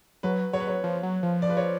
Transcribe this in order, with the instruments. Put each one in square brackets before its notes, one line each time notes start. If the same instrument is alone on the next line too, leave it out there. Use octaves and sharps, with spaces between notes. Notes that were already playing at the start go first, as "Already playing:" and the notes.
[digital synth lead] F#3 [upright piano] B4
[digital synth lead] F#3 [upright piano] C#5
[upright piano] B4
C#5
[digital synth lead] F3
F#3
F3
[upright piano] D5
B4
C#5